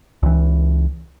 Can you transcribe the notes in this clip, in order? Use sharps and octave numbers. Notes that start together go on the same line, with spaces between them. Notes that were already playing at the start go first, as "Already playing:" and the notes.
C#2 E3